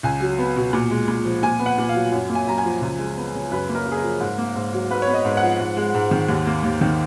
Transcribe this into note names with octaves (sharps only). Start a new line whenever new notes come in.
C#2 G#5
F#3
B3
B2
A#2
G#3
A#2
F3
A#2 G#5
B3
F#5
A#2
F5
F#3
F#2
A#3
G#5
F#2 A#5
G#5
F3
C#2
G#3
B3
C#3
F#2 B4
A#3
A#4
F#2
G#4
A#4
F3
G#2
A#3
G#2
F#3
G#2 B4
C#5
B3
D#5
G#2
F#5
F3
G#2
G#3
G#2
D#3
D#2
A#3
D#2
D#3